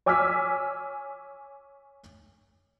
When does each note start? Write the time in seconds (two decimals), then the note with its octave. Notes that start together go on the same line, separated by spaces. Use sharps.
0.06 C#5 G#5 D6 E6 F6 B6